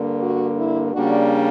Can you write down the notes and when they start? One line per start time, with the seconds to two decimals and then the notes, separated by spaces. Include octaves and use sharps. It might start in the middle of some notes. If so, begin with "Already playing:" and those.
Already playing: G2 D3 A#3
0.22 F#4
0.58 E4
0.93 C#3 G3 A#3 D4 F#4